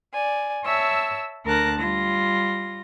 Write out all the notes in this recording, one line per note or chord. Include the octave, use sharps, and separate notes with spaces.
D5 G#5
C#5 E5 A5 E6
D2 A#4 A5 F#6 A#6
G3 F4 A#6